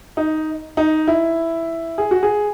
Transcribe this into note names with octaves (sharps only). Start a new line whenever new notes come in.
D#4
D#4
E4
G#4
F#4
G#4